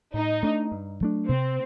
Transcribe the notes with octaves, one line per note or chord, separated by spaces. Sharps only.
A2 D#4
A3 D4
G2
F#3 A3 D4
C3 C4